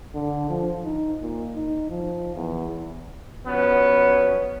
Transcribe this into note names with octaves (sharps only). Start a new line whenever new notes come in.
D3
F3
D#4
A#2
D#4
F3
E2
F3 F#3 B3 C#4